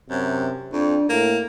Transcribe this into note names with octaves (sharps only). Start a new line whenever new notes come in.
F#2 C3
F2 D4
A2 A#3